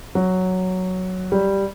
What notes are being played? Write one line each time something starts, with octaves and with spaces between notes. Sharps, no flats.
F#3
G3